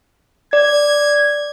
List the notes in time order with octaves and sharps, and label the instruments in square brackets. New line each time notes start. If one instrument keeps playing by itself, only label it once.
[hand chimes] D5 [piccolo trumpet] G#6